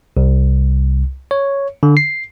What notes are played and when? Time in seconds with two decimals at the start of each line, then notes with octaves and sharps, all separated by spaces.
0.17 C2
1.31 C#5
1.83 D3
1.97 C7